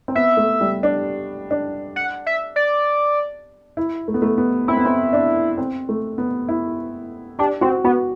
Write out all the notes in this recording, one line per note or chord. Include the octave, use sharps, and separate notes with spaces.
C4
B3 E5
A3
G3
D4
D4
F#5
E5
D5
E4
A3
B3
A3
B3
C4 E4
B3
C4
D4
C4
A3
B3
E4
D4 G4
C4 F#4
B3 F#4